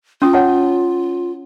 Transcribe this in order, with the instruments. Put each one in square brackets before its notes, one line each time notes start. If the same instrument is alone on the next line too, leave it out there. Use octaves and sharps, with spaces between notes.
[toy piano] C#4 D#6 [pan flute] F4
[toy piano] C#5 F#5 A5